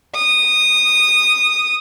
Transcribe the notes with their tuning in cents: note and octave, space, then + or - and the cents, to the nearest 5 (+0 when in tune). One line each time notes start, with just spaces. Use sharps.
D#6 -15